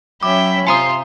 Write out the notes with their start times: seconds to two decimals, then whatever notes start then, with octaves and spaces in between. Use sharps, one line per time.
0.23 F#3 C#4 E5 G5 B5 D6
0.67 C3 F4 C5 E5 G#5 A#5 C6 D#6